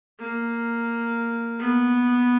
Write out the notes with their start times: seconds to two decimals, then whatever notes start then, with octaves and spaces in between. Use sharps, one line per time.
0.19 A#3
1.60 B3